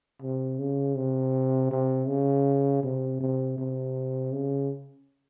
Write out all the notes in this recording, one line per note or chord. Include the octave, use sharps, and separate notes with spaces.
C3
C#3
C3
C3
C#3
C3
C3
C3
C#3